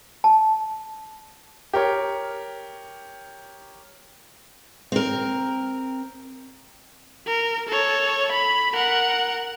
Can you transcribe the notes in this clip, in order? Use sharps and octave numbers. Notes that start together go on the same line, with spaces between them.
A5
G4 A#4 C#5
C4 A#4
A#4
A4 C#5
B5
A#4 F#5